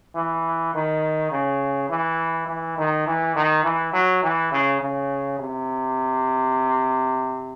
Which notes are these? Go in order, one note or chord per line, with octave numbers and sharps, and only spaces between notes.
E3
D#3
C#3
E3
E3
D#3
E3
D#3
E3
F#3
E3
C#3
C#3
C3